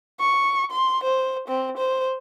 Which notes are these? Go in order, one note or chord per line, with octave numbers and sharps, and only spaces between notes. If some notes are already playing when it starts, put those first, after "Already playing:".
C#6
C6
C5
C4
C5